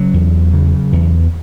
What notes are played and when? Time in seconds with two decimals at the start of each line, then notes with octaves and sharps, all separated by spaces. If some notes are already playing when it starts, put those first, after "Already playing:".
Already playing: C#3 F#3
0.14 E2
0.53 C#3
0.92 E2